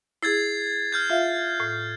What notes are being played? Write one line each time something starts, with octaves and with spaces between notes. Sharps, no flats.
E4 G#4 G#6 A6 C7
F6 G6 G#6
F4 E5 F5
A2